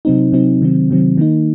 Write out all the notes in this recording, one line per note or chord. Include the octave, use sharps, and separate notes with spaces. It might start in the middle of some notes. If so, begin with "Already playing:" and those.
C3 F#3 C4 D#4
C3 F#3 C4 D#4
C3 D#3 F#3 C4
C3 D#3 F#3 C4
D#3 A#3 D#4